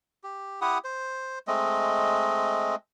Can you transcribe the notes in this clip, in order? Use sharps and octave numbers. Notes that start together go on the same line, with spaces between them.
G4
E4 G4 F#5 D#6
C5
G#3 A3 C4 D#5